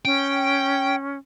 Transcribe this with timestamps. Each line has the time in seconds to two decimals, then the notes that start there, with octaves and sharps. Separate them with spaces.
0.05 C#4 G5